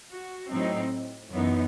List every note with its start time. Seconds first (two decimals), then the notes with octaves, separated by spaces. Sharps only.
0.11 F#4
0.51 A2 F#3 C4 D#4
1.30 F#2 E3 B3 D#4